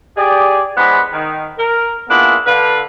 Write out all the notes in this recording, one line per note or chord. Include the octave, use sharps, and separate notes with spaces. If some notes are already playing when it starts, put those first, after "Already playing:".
G4 G#4 D5
E3 G#3 B3 D4 C5 B5
D#3
A#4
A#3 B3 D4 E4 F4 G#4
D3 B4 F5